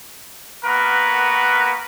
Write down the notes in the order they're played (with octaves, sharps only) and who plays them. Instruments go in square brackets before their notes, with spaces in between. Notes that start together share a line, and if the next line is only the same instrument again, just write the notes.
[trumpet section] A#3 B3 F#4 A#4 B4